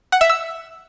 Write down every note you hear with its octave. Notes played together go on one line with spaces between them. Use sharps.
F#5
E5
E6